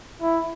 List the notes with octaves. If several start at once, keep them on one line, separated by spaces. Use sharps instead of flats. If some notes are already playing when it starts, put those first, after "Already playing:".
E4